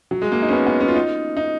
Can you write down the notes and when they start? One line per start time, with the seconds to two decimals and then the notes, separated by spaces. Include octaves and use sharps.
0.11 F#3
0.22 G#3
0.32 A#3
0.42 D#4
0.49 C#4
0.53 B3
0.67 B3
0.80 C#4
0.88 F4
0.95 D#4
1.37 D#4